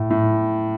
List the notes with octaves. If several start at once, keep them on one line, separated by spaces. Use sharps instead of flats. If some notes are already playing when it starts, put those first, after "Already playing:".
Already playing: A2
A2